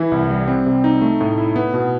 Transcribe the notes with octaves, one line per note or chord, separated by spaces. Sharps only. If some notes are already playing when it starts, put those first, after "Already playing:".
Already playing: E3 E4
C2
G3
C4
C3
D#4
A3
A2
E4
B3
B2